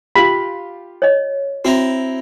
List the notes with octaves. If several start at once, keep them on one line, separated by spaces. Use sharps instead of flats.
F4 G4 B5
C#5 D#5
C4 E4 F#4 A#5